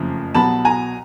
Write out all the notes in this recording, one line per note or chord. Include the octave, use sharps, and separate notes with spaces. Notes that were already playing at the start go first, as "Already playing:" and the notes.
Already playing: F#1 F2 C#3 F3 A3
C2 B2 F#3 B3 A5 B5
G#5 A#5